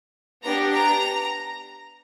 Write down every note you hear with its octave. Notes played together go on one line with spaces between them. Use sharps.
B3 D4 G4 A#5
A#5